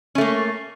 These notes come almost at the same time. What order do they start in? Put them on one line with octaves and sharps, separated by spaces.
C#4 A3 A#3